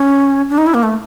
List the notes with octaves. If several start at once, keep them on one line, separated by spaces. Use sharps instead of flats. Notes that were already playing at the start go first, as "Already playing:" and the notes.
Already playing: C#4
D4
D#4
E4
A#3
A3